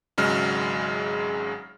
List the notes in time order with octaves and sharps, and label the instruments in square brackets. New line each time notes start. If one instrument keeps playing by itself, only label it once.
[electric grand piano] G#1 C#3 F#3 G#3 F6